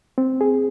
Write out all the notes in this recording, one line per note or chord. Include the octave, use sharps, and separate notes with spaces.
C4
G#4